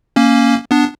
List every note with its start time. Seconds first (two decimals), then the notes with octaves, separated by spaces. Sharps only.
0.16 A#3 C#4
0.71 B3 D4